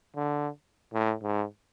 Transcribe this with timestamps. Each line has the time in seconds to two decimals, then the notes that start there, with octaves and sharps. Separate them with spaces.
0.16 D3
0.93 A2
1.23 G#2